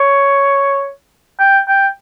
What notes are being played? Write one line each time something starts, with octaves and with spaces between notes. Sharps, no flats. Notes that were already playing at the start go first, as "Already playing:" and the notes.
Already playing: C#5
G5
G5